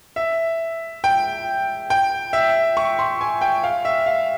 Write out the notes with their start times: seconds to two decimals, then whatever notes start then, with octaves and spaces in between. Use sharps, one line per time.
0.16 E5
1.04 G5
1.90 G5
2.33 E5
2.77 C#6
2.99 C6
3.21 G#5
3.41 G5
3.64 F5
3.85 E5
4.06 F5